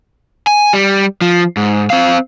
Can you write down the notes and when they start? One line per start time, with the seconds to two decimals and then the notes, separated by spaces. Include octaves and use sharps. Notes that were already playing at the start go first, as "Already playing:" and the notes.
0.47 G#5
0.73 G3
1.21 F3
1.57 G#2
1.90 C4 F5